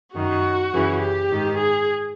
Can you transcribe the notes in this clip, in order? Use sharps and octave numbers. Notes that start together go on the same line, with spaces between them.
F#2 D#3 F#4
F#2 C#3 E3
G4
G#2 D#3
G#4